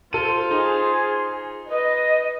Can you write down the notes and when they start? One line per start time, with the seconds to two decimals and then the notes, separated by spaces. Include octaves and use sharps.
0.13 F4 A4 C5 D#7
0.51 D#4 G#4
1.67 B4 D#5